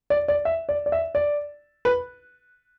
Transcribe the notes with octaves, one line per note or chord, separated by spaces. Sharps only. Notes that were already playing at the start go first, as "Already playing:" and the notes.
D5
D5
E5
D5
D5
E5
D5
B4